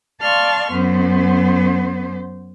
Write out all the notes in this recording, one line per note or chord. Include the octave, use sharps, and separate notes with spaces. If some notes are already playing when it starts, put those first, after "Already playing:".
D5 F5 A5 C6 C#6 F6
F#2 B3 C5